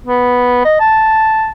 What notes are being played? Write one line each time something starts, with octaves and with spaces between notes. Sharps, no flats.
B3
D#5
A5